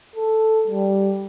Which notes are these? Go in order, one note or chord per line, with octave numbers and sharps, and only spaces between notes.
A4
G3